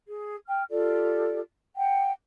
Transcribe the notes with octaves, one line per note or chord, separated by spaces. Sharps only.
G#4
G5 F6
F4 G4 A4 D5
F#5 G5